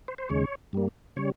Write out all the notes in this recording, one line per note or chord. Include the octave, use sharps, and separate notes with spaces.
C5
C5
D#2 C#3 G#3 C#5
G2 G3 A#3
C#3 G3 C#5